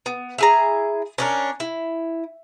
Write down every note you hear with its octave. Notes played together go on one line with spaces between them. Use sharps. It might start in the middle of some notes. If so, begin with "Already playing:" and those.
B3
E4 G#4 A#5
C#4 D4 A#4
E4